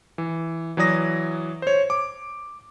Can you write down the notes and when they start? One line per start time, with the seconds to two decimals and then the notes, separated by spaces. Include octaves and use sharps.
0.18 E3
0.77 E3 F#3 D5 D#6 A#6
1.62 C5 C#5
1.90 D6